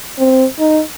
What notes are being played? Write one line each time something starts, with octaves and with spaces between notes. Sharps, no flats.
C4
D#4